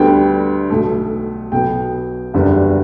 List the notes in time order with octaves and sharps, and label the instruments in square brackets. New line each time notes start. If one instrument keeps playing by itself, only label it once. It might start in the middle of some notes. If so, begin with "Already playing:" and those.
Already playing: [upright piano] D2 D3 G3 B3 G5
B1 B2 A3
B1 B2 F#3 B3 G5
F#1 E2 D3 G3 B3